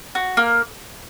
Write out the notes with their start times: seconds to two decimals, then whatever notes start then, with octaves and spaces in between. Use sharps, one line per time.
0.15 F#4
0.37 A#3